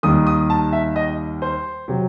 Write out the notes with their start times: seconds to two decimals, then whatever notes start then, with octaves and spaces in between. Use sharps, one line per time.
0.03 D#2 D#3 G3 D#6
0.27 D#6
0.50 A5
0.72 E5
0.96 D#5
1.42 C5
1.88 C3 F#3